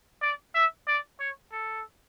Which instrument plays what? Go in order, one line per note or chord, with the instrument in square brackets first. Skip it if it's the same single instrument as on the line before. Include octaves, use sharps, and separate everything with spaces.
[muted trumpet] D5
E5
D5
C#5
A4